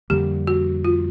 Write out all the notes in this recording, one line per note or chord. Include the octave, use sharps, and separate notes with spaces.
F2 D3 G3 A#3 G4
F#4
F4